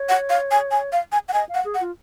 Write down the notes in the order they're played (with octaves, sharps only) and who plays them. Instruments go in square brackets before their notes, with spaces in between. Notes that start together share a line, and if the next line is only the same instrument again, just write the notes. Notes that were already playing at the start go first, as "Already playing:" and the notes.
Already playing: [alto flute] C#5
[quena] F#5
F5
G#5
G#5
F5
G#5
F#5
[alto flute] D#5 [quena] G#5
[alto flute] F5
[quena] F#5
[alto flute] G#4
[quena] F#5
[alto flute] F4